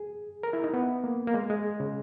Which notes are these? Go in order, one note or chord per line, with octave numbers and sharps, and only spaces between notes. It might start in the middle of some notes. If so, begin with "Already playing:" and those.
Already playing: G#4
A#4
E4
D#4
B3
A#3
A#3
G#3
G#3
C#3